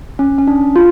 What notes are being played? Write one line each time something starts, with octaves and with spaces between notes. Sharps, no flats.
C#4
C#4
D4
F4